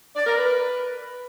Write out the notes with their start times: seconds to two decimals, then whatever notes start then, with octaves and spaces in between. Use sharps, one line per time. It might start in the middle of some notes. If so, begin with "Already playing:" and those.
0.16 D5
0.27 A#4
0.37 B4